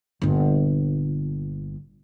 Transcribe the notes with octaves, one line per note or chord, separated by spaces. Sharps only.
G1 A#2